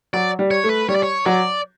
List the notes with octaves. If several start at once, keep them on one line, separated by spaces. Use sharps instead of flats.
F#3 D5
G3
C#5
A3
B4
G3 C#5
D5
C#5
F#3 D5